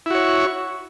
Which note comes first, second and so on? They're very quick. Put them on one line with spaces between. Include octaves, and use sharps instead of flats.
E4 F#4 C#5